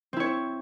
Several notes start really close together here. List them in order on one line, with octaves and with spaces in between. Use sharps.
C4 E4 C#5